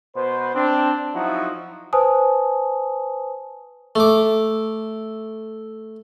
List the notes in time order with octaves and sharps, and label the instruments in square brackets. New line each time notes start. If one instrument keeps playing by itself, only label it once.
[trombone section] B2 B4 C5
C4 D4
F3 F#3 D#4 E4 F#4
[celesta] B4 C5 G#5 A5 D#6
[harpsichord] A3 D6